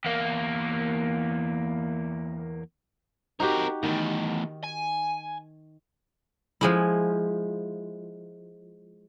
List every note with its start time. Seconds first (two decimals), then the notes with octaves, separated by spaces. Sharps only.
0.05 E2 A#3
3.40 C4 D#4 F#4 G4 A#4
3.83 E2 A2 D#3
4.64 G#5
6.61 F3 G#3 E4